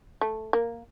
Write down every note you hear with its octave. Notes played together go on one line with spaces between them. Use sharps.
A3
A#3